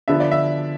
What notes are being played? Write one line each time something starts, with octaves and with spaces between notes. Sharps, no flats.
D3 F3 B3 D4 E5
D5
E5